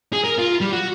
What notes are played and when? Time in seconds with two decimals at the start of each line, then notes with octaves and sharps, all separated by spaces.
0.13 G#4
0.24 A#4
0.38 F4
0.61 G3
0.72 F#4